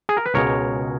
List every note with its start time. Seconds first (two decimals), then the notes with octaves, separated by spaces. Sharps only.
0.09 G#4
0.17 A#4
0.26 B4
0.34 C#2 B2 G#3 A#4 C#5